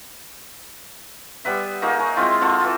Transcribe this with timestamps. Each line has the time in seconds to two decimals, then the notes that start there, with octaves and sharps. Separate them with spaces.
1.45 G3 B3 B4 E5
1.82 A#3 D#4 F#4 G#4
1.99 G#4 A#4 C#5
2.16 G#3 C4 E4 F4
2.41 C4 F4 F#4 A4
2.60 E3 F4